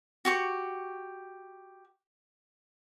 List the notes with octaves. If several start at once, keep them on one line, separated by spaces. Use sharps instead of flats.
F#4 G4 C#6